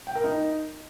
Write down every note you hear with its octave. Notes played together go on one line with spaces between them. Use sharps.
G5
A#4
D#4